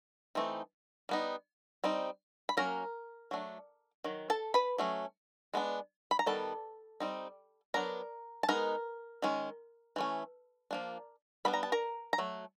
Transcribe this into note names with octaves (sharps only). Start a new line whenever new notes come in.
E3 A3 C4 D#4
G3 B3 D#4
G3 C4 D#4
B5
F#3 A#3 C#4 A#4 A#5
F#3 A3 D4
D#3 F#3
A4 A5
B4 B5
F#3 A3 C#4
G#3 B3 D4
B5
A#5
D#3 G3 B3 A4 A5
G3 C4 D#4
F#3 B3 D4 A#4 A#5
A5
G#3 B3 D#4 A#4 A#5
D#3 G#3 C#4
E3 A3 C#4
F3 A#3 D4
G3 B3 D4 B5
A#5
A5
A#4 A#5
A#5
F#3 A3